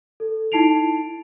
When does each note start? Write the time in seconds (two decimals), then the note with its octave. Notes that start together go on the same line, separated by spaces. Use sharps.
0.20 A4
0.52 D#4 E4 A5 C7 D7 F7